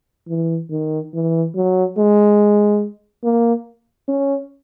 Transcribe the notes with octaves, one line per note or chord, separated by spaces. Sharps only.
E3
D#3
E3
F#3
G#3
A#3
C#4